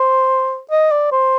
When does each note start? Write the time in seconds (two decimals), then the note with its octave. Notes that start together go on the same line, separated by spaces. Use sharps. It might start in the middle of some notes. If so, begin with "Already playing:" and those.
Already playing: C5
0.71 D#5
0.92 D5
1.12 C5